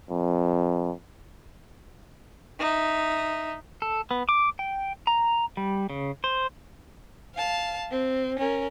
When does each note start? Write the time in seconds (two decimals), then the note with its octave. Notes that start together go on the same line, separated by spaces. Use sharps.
0.10 F2
2.59 D#4 E5
3.82 A4
4.11 B3
4.29 D6
4.59 G5
5.07 A#5
5.57 G3
5.90 C#3
6.24 C5
7.35 F5 A5
7.91 C4
8.39 C#4 A#4